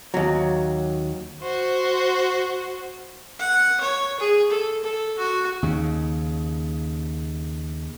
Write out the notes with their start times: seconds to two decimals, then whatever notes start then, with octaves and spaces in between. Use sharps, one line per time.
0.14 D#2 F#3
1.42 F#4 C5
3.39 F#5
3.81 C#5
4.20 G#4
4.50 A4
4.83 A4
5.18 F#4
5.63 D#2 C#3